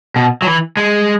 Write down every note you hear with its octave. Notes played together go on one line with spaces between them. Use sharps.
B2
F#3
E3
G#3